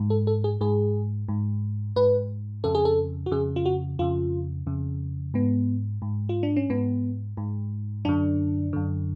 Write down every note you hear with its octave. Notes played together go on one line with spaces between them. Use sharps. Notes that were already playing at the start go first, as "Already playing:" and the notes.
Already playing: G#2
A4
A4
G#4
G#2 G#4
G#2
G#2 B4
F2 C#3 A4
G#4
A4
F#4
F2 C#3 G#4
F4
F#4
F2 C#3 F4
F2 C#3
G#2 B3
G#2
F4
D4
C#4
G#2 B3
G#2
F#2 D3 D4
F#2 D3